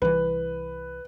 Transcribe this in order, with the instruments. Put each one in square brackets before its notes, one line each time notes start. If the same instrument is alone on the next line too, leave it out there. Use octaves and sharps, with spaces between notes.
[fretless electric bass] C2 E3 [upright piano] B4